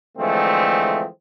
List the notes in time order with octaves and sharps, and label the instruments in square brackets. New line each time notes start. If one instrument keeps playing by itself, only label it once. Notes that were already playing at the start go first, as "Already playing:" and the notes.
[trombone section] D3 E3 F3 G#3 A3 C4